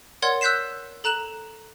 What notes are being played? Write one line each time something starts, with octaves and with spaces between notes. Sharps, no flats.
A#4 C#5 D5 F#5 C6 G#6
E6 F#6 G6 B6 C7 E7
A4 A#5 F#6 E7 F#7